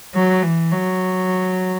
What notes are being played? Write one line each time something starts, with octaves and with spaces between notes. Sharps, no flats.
F#3
E3
F#3